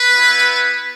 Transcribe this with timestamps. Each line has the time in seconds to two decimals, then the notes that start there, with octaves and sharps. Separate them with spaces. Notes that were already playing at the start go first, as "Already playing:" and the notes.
Already playing: B4
0.11 B3 E4